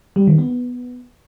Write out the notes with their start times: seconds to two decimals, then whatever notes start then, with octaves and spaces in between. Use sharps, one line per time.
0.16 G3
0.27 D#3
0.38 B3